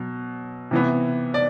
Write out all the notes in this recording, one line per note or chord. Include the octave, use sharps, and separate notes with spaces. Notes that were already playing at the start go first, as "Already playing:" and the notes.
Already playing: B2 F#3
C3 E3 B3
D5